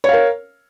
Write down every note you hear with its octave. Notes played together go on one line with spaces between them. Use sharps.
A#4 C#5 F5